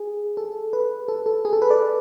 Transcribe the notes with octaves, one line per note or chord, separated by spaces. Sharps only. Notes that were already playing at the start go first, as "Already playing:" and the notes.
Already playing: G#4
A4
B4
A4
A4
G#4
A4
B4
D5